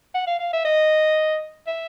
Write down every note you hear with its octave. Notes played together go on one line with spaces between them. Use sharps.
F#5
F5
F5
E5
D#5
E5